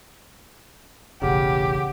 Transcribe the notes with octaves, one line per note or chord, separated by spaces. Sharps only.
E1 A1 C#3 G4 F#5